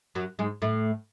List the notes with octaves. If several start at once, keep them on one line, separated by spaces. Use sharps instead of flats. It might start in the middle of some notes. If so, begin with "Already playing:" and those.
F#2 F#3
G#2 G#3
A2 A3